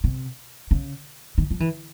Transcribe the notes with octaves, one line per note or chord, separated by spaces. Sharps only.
C3
C#3
D#3
F3
E3